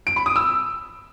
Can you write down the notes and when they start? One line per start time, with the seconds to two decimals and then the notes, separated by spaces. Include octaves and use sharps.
0.07 D7
0.16 B5
0.26 D#6
0.36 E6